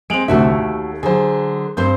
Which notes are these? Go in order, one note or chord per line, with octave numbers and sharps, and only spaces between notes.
G#3 C4 D7 F7 F#7
D1 C2 D3 A3 F#4 E5
D#2
D3 F#3 G#4 C5
G2 C4 C5 G6